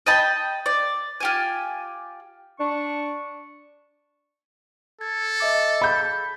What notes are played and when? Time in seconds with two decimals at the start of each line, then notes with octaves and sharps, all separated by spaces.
0.07 D#5 G5 A5 B5
0.66 D5
1.20 F4 G4 G#5
2.59 D4 C#6
5.01 A4 G#6
5.40 D#5 E5 D6
5.82 G#4 F5 B5 G6